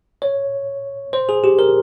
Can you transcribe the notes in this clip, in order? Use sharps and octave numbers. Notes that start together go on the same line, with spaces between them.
C#5
C5
G#4
G4
A#4